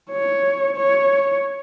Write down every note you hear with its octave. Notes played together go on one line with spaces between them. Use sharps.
C#5
C#5